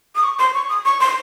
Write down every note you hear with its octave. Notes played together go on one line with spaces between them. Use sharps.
D#6
C#6
C6
C#6
D#6
C#6
C6